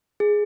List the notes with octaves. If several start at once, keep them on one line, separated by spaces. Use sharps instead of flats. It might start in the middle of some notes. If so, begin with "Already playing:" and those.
G#4